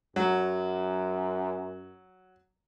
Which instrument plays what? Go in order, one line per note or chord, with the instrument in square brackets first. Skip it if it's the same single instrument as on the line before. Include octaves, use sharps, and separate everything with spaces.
[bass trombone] F#2 [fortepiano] F#3